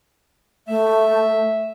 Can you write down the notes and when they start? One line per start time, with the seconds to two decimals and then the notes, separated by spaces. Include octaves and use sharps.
0.68 A3 E5